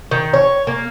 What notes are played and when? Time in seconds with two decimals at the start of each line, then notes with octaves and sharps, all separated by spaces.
0.11 D#3
0.34 C#5
0.67 A#3